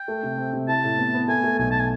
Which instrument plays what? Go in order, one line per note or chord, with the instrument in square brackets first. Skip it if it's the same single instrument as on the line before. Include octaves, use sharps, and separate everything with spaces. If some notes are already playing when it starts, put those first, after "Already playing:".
Already playing: [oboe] G5
[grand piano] A3
C3
C4
C3
[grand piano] E4 [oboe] A5
[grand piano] A2
B3
B3
[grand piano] A3 [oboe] G#5
[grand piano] A3
[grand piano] B1 [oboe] G#5
[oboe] A5
G#5